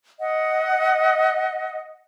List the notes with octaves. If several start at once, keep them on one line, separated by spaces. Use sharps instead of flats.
D#5 F#5